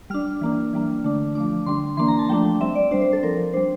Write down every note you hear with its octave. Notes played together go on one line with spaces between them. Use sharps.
G3 D4 F6
E3 A#3 D4
E3 G3 A#3 D4
D3 A3 D4
F3 A3 D4 D6
D3 G3 D4 C6
E3 A#3 D4 C6
A#5
A5
F3 A3 D4 G5
G3 C4 E5
D5
G3 D4 C5
C5
A4
F3 C4 A#4
G3 D4 C5